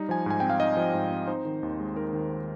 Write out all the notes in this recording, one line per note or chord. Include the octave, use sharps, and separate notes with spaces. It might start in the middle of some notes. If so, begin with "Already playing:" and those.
Already playing: G3 D#4
F3 G#5
G#2 G#5
C4 G5
F5
D#4 D#5
F3
G#2
C4
D#4 C5
D#3
D#2
G#3
D#4 A#4
D#3